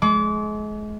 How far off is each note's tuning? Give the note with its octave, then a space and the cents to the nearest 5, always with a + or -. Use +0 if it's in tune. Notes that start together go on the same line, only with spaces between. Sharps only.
G#3 +35 D6 -30